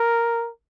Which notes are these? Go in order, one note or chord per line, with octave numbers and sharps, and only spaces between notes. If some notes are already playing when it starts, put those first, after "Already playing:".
Already playing: A#4